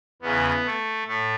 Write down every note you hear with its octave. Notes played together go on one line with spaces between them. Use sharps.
E2 C#3 E3 B3
A3
A2 A3